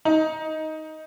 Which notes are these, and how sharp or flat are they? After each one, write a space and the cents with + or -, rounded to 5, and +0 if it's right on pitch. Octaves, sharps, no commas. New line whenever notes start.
D#4 +10